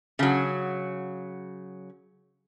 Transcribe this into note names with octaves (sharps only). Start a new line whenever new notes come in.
C#3 F#3